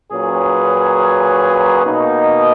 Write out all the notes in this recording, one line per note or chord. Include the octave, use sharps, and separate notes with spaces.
A#2 F#3 C#4 G#4 B4
B2 A#3 D#4